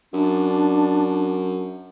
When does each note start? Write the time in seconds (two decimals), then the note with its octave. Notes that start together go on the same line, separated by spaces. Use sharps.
0.13 F#2 D4